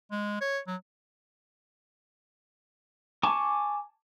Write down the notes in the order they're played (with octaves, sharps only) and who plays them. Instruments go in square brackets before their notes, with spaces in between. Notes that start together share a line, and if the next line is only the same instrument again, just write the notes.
[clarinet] G#3
C#5
F#3
[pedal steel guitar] G#5 A5 C#6 D6